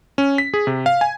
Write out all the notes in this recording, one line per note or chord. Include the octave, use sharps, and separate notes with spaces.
C#4
B6
G#4
C3
F5
G#5